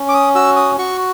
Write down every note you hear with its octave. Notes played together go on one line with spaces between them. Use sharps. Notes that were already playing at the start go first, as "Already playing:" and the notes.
Already playing: C#4
D6
D#6
F#4 E6
D#6
F#4 C#6